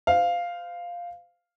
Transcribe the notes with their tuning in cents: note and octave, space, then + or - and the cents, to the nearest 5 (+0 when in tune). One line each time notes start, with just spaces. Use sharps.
C5 -40 F5 +0